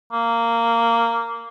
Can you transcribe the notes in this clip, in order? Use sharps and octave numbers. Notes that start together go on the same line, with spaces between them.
A#3